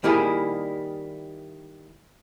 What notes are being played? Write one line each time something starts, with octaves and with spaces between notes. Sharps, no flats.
D#3 G3 A#3 E4 G#4